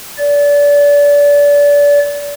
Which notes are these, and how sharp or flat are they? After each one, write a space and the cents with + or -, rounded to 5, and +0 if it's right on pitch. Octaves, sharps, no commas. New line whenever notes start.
D5 -30